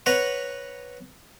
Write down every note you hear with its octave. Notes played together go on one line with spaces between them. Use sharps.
B4 C#5 F#5 A#5 C#6